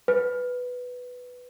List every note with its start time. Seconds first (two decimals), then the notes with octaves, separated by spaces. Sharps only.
0.08 B4